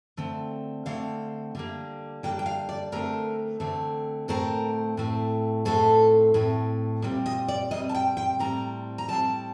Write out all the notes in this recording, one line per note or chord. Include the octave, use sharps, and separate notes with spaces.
D3 A3 C4
D3 A3 C4 F5
D3 G3 A#3
D3 G3 A#3 G5
G5
F5
D5
D3 A3 C4 A#4
D3 A3 C4
A2 A3 C4 A#4
A2 A3 C4
A2 A3 C4 A4
A2 A3 C4
A#2 G3 C4
D#5
D5
A#2 G3 C4 D#5
A5
G5
G5
A2 G3 C4 A#5
A#5
A2 G3 C4 A5